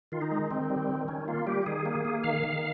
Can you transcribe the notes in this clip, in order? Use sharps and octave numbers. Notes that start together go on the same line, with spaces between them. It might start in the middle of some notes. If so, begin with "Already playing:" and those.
D#3 F4
D#4
G#3
D#3 C4
G3
D#3
D#3 C#4
A#3 F4
G3 G4
D#3 G#4
A#3
A#3
D#3 F5
D#3